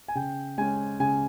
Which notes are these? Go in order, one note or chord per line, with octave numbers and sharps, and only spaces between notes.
G#5
C#3 G5
G#3 C#4 G#5
C#3 G#5